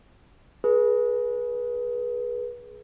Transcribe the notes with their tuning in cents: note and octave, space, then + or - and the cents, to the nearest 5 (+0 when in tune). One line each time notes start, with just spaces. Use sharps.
G#4 +15 B4 -25